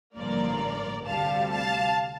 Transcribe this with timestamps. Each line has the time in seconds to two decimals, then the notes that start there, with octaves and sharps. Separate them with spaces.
0.15 A1 G2 D3 F3 A#3 A#4 D5
1.06 D2 C3 G3 F5 A5
1.52 F5 A5